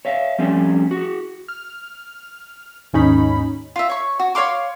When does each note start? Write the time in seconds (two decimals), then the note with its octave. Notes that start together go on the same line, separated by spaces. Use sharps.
0.05 C#5 E5 F5
0.39 F3 G3 A3 C4 C#4
0.91 F#4 G#4
1.48 F6
2.93 D#2 G#2 C#4 D#4 B5
3.76 F4 E5
3.89 C#5 C#6
4.19 F#4
4.35 C#5 F5 C6 D6